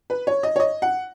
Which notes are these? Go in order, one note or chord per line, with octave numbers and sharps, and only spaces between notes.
B4
C#5
D#5
C#5
D#5
F#5